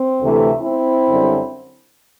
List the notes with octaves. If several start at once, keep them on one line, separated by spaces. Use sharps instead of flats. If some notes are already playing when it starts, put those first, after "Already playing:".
Already playing: C4
D2 C3 E3 A3
C4 E4
F#2 D3 G3